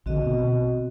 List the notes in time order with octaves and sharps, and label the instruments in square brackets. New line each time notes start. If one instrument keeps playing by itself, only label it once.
[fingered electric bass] A#1 D3 [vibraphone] C4 F#4 D#5
[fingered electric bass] B2